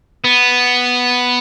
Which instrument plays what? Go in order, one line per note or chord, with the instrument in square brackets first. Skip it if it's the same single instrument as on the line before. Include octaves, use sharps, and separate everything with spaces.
[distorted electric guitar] B3